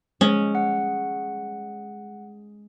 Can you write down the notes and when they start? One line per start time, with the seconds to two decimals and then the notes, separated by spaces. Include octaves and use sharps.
0.21 G#3 C#4
0.55 F#5